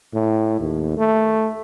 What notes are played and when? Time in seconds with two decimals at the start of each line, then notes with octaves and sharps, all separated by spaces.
0.14 A2
0.59 D#2
0.97 A3